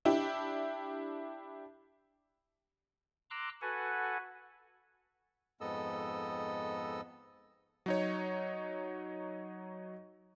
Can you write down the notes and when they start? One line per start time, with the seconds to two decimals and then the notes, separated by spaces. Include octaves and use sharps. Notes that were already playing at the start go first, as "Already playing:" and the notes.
0.05 D4 E4 G4
3.30 A#5 C6 D6 E6 F#6
3.61 F#4 A4 B4 F#5 G#5
5.61 F2 G#2 B3 A4 D#5 E6
7.86 F#3 D#4 C#5